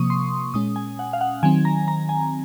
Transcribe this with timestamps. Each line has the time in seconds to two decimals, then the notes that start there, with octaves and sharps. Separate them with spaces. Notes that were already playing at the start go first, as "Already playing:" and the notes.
Already playing: C3 F3 A#3 C#6 D#6
0.10 C6
0.54 A#2 G#3 C#4 D#6
0.76 G#5
0.99 F#5
1.13 F5
1.21 F#5
1.43 D#3 F#3 C4 G#5
1.65 A#5
1.88 A#5
2.09 G#5